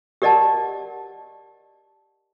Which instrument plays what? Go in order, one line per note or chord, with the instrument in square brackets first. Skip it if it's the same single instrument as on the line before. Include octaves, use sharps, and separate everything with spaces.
[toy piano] G4 A#4 D5 D#5 F#5 A5